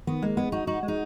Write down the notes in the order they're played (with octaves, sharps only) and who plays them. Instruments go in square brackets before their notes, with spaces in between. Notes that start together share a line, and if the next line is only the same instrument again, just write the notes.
[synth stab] D#3 [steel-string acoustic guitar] B3
[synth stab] G#3 [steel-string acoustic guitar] A#3
[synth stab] G#3 [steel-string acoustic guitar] B3
[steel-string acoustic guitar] D#4 [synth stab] F#4
[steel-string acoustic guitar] D#4 [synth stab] F#4
[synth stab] G#3
[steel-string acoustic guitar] D#4